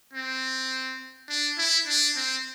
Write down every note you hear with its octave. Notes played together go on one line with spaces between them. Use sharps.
C4
D4
E4
D4
C4